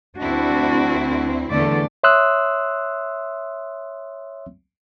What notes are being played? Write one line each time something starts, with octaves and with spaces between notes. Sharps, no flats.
D2 C4 D4 E4 F#4
E2 D3 A3 D5
C#5 E5 C6 D#6 E6 F#6